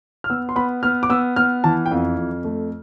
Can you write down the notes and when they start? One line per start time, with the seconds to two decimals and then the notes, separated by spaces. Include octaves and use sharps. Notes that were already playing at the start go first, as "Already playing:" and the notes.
0.24 F6
0.30 B3 E6
0.49 C6
0.56 B3 B5
0.83 B3 F6
1.03 D6
1.10 B3 E6
1.36 B3 F6
1.64 E3 A5
1.86 G5
1.91 F2 F5
2.17 F2
2.44 A3